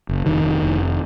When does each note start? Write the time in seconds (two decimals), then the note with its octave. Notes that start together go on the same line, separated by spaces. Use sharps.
0.09 F#1
0.26 F1 D#3
0.44 F1
0.62 F1